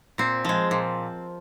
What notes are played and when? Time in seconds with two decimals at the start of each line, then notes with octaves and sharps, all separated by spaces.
0.18 A#2 C4
0.45 F3 G#3
0.71 A#2